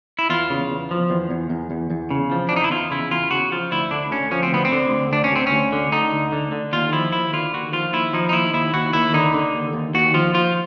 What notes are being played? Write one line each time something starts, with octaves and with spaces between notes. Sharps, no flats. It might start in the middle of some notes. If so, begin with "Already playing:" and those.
E4
E2 F4
C#3
E2
F3
E2
E2
E2
E2
E2
C#3
F3
E2 D4
D#4
E4
E2 F4
C#3 E4
E2 F4
C#3 F#4
F3 F4
D2 E4
D3 D4
D2 C#4
F3 C#4
C4
D2 B3
C4
D3
D2
D2 D4
C#4
D2 C4
C#4
D2
D3
D3 D#4
D2
D3
D3
D#2 F4
F3 E4
D#2 E4
D3 F4
D#2 F#4
F3 F4
D#2 E4
F3 D#4
D#4
D#2 E4
D#2 E4
D#2 F#4
D#2 E4
D3 D#4
D3
D#2
D#2
D#2 F#4
F3 F4
F3 F4